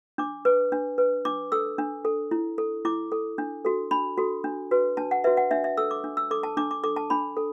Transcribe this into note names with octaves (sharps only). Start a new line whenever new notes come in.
D4 D6
B4
D4
B4
D4 D6
A4 E6
D4
A4
E4
A4
E4 D6
A4
D4
F#4 A4
D4 B5
F#4 A4
D4
F#4 B4
D4 A5
F#5
F#4 B4 E5
F#5
D4 E5
E5
A4 E6
D6
D4
E6
A4 D6
A5
D4 D6
D6
A4 D6
A5
D4 B5
A4